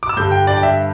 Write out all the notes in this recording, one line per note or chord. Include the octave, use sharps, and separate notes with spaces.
D6
E6
G2 D3 G3 G6
G5
D5
G5
E5